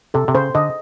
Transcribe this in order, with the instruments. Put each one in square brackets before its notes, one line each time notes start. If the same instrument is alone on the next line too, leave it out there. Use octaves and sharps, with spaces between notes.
[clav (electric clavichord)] C3 [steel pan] A4
[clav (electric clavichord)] C3
[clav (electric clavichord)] C#3 [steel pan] C5
[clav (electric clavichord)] D3 [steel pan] D#5